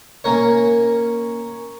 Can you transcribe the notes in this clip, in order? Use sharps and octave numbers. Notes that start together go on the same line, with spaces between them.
A#3 C#4 A#4 C#5